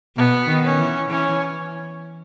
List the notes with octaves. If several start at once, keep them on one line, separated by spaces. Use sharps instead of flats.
B2 B3
D#3
C#4
E3
E3 C#4